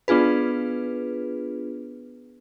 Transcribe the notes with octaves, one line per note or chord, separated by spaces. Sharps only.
B3 D4 F4 G#4 B4